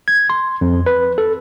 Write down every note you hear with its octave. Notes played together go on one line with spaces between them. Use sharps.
G#6
C6
F2
B4
A4